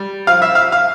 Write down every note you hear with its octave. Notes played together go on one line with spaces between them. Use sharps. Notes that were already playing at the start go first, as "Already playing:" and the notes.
Already playing: G3
F3 F5
E5
F5
F5